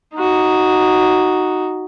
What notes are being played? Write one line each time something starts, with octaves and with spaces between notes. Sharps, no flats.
D#4 F#4